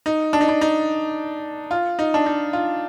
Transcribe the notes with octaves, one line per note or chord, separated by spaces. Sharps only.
D#4
D4
D#4
D4
D#4
F4
D#4
D4
D#4
F4